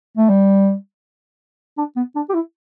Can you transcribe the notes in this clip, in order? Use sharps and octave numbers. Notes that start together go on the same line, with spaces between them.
A3
G3
D4
B3
D4
G4
E4